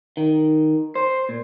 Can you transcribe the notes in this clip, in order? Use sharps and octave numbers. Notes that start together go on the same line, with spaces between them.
D#3
C5
A#2